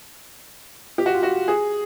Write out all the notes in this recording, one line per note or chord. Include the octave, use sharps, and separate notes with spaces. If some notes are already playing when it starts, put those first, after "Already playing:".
G4
F#4
F4
F#4
G#4